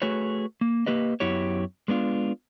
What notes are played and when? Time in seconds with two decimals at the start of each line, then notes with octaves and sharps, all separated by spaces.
0.02 A3 F#4 G#4 B4 C#5
0.61 A#3
0.86 A#3 G4 B4 D#5
1.20 F#2 B3 E4 G4 C#5
1.88 G#3 B3 D4 F4